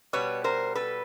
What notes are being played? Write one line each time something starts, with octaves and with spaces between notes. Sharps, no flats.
B2 G3 B4 C#5
A#4 C5
A4 B4